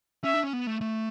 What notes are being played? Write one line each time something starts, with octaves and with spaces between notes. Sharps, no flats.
C#4 E5
D4
C#4
B3
A3
A3